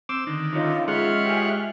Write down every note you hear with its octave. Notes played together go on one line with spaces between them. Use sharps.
C4 D6 E6
D3 D#3
F3 C#4 D#4 F4
G#3 F4 C#5 E5 F#5 F6
G4 G#4